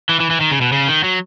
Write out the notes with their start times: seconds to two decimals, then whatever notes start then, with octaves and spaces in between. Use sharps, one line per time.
0.09 E3
0.20 E3
0.31 E3
0.41 D#3
0.52 C#3
0.61 B2
0.72 C#3
0.88 D#3
1.04 F#3